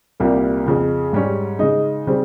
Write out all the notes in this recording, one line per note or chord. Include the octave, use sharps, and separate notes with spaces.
C2 A#2 G3 A#3
F2 C#3 F3
G#2 G3 C#4
C#3 G#3 D#4
C#3 G3 C4